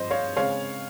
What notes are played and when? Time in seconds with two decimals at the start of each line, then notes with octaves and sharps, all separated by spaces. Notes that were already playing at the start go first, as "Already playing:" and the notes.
Already playing: G2 F3 C4 C5 D#5
0.10 C#5 F5
0.37 C#3 G#3 C4 C#5 F5